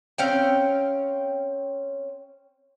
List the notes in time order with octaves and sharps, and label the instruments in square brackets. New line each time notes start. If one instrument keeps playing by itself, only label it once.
[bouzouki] C4 C#4 F5 G5